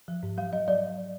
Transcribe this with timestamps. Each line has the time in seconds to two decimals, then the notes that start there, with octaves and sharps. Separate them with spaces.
0.08 F3
0.23 G#2
0.38 F#3 F5
0.53 F#3 D#5
0.68 F#3 D5